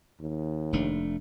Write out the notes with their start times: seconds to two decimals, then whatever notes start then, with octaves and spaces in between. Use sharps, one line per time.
0.21 D#2
0.73 F1 A3 D4